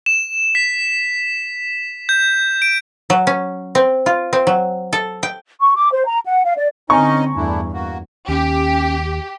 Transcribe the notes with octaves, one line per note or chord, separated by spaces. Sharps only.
E7
B6
G6
D7
F#3
C#4
C4
F4
C4
F#3
A4
G5
C#6
D6
C5
A#5
F#5
F5
D5
D3 C4 C#4 D#4 D#5 G#5 A#5 C#6
E2 G2 A3 D4 E4
A#3 F#4
D#2 C#4 G4